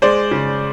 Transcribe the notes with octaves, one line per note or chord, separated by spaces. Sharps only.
G#3 C5 D5
C#3